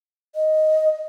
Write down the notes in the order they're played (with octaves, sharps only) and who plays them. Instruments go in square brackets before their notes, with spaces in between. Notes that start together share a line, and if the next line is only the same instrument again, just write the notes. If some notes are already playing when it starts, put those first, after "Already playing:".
[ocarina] D#5